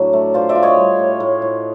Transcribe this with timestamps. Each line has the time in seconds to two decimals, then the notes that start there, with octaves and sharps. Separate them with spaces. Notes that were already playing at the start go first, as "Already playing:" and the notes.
Already playing: A2 F#3 D4
0.13 A3
0.34 F4 C5 D5
0.49 D5 E5
0.55 F4
0.63 C#5 D#5
0.77 G3
0.99 A2
1.20 A2
1.42 A2